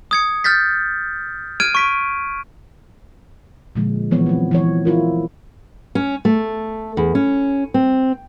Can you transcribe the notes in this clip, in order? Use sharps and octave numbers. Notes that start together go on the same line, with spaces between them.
D#6 G#6 C#7
F6 G6 A6 B6
F6 G#6 D7 D#7
C#6 B6 D7
A#2 D3 F3 G#3
E3 F3 B3 C#5
F#3 C4
E3 F3 C#5
E4 F4 A#4
C#4
A3
E2
C#4
C4